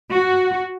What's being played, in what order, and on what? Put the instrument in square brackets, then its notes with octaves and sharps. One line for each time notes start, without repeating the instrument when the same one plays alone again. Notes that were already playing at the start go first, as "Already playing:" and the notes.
[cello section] F#4